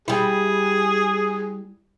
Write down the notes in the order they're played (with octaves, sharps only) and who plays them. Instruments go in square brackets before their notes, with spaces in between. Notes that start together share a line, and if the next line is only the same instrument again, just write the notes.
[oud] G3 E4 [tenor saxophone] G#4